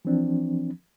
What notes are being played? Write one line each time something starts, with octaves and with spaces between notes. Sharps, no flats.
E3 F3 C4 D4